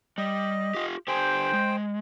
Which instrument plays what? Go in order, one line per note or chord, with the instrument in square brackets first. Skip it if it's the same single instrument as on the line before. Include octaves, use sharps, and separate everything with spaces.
[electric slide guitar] G3 [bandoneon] D#5
[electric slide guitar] F4 G4
[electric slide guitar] D3 G4 G#5 [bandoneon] C5 G5
[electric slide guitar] G#3